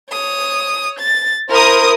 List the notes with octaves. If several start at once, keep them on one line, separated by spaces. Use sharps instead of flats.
C#5 D#6
A6
E4 A#4 C5 D#6